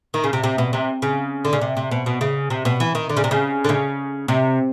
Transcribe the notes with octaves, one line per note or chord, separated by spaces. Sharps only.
D#3
C#3
C3
C3
B2
C3
C#3
D3
C#3
C3
C3
B2
B2
C#3
C3
B2
E3
D#3
D3
C#3
C3
C#3
D3
C#3
C3